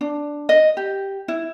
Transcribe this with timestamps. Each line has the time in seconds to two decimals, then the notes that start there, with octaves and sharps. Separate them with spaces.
0.01 D4
0.49 D#5
0.77 G4
1.28 E4